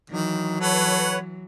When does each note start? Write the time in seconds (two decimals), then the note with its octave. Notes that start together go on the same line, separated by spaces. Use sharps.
0.10 D#3 E3 F#3
0.61 A4 B4 C#5 F#5